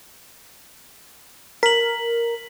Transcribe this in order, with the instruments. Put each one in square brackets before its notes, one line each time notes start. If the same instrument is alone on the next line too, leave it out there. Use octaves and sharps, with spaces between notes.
[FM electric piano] A#4 [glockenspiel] B6 F#7